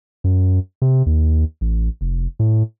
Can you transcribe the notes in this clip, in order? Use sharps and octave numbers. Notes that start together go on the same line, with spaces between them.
F#2
C3
D#2
A1
F1
A2